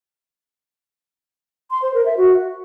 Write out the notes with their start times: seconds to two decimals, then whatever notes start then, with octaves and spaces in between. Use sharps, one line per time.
1.71 C6
1.82 C5
1.94 A#4
2.06 E5
2.17 F#4